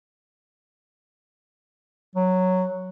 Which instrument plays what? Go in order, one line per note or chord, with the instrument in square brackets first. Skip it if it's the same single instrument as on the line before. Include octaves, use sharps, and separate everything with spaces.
[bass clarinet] F#3